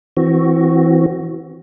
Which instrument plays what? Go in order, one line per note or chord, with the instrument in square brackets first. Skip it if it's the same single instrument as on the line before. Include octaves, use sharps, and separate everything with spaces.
[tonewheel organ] E3 C4 F#4